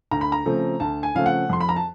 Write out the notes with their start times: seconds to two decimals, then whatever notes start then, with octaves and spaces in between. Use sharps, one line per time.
0.11 D2 A#5
0.21 B5
0.32 A#5
0.45 C#3 F3 A3 C4
0.80 D2 A5
1.03 G#5
1.15 C#3 F3 A3 C4 F5
1.26 F#5
1.49 F2 C6
1.61 B5
1.69 A#5
1.76 A5